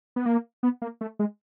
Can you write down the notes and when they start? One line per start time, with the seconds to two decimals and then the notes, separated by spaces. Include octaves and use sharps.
0.16 B3
0.26 A#3
0.63 B3
0.82 A#3
1.01 A3
1.19 G#3